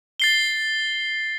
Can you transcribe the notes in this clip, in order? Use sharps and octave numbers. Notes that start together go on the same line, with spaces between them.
A6 C7 G7